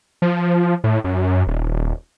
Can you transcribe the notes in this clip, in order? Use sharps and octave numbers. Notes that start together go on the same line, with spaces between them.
F3
A2
F#2
D#1